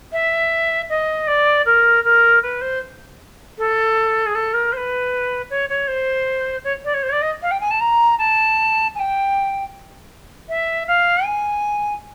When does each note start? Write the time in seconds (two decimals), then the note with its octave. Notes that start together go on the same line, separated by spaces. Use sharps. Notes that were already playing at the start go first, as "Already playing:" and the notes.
0.12 E5
0.89 D#5
1.27 D5
1.65 A#4
2.04 A#4
2.42 B4
2.61 C5
3.58 A4
4.25 G#4
4.34 A4
4.53 A#4
4.72 C5
4.76 B4
5.50 C#5
5.69 C#5
5.87 C5
6.64 C#5
6.84 D5
6.93 C#5
7.02 C5
7.08 C#5
7.12 D5
7.21 D#5
7.41 F5
7.51 G5
7.60 G#5
7.70 A5
7.80 A#5
8.18 A5
8.95 G#5
8.99 G5
10.48 E5
10.87 F5
11.24 G#5